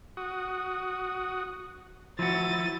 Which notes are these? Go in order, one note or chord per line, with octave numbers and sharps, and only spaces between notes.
F#4 D#6
F3 E4 F#4 A6 D#7